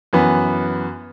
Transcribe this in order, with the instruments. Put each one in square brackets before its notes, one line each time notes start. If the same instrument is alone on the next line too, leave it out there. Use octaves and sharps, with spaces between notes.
[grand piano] F#2 E3 B3